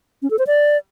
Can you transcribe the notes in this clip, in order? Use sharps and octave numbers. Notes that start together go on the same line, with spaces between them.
C#4
A4
C5
D5